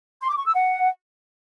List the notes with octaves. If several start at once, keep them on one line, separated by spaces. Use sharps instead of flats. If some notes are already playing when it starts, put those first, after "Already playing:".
C6
D6
C#6
E6
F#5